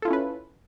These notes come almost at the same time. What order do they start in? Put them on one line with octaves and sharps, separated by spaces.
A4 F4 E4 C#4 B4